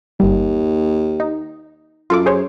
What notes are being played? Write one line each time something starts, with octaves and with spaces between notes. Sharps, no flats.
G1 D#2 G3
D#4
F#2 F4 A4 D6
G#4 C5 C#5